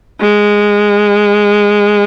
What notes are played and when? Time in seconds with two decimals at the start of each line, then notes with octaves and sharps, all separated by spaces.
0.20 G#3